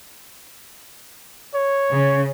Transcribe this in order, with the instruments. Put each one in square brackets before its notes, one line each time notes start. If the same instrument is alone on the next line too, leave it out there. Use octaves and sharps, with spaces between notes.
[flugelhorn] C#5
[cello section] C#3